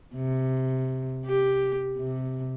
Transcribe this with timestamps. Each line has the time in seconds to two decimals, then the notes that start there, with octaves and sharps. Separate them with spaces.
0.16 C3
1.26 G4
1.97 C3